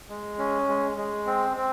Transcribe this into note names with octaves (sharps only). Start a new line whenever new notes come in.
G#3
C#4
G#3
G#3
C4
C4